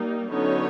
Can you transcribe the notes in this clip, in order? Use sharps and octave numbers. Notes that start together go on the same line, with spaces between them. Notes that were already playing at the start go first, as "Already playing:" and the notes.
Already playing: G3 A#3 D#4
D3 F#3 B3 C#4 D#4 C#5